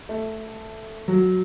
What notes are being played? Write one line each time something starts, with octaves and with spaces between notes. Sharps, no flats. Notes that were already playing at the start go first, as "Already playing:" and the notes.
A3
F#3